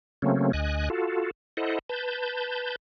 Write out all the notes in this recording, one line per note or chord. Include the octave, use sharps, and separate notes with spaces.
C#3 F#3 A3 A#3 C4 C#4
D2 D#5 G#5 F#6
F4 F#4 A4
E4 A4 C5 D#5 F#5
B4 A5 G6